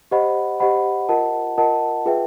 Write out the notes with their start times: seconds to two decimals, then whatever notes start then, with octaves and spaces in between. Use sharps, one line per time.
0.11 G4 C5 D#5 F#5 B5
0.60 G4 C5 D#5 F#5 B5
1.09 F4 A#4 D#5 F#5 A5
1.57 F4 A#4 D#5 F#5 A5
2.05 F4 G#4 B4 E5 G5